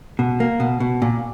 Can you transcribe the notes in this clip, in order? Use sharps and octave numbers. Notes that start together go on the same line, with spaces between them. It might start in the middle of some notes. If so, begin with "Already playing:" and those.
B2
A#3
B2
B2
A#2